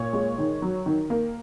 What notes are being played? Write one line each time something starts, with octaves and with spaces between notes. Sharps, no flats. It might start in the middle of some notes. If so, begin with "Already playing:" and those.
Already playing: A#2 C#5
G#3
D#3
F#3
D#3
A#3